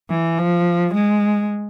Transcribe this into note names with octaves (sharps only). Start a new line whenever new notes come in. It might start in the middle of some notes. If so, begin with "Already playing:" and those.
E3
F3
G#3